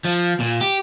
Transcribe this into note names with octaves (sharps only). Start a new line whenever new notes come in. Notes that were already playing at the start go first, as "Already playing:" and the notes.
F3
A#2
G4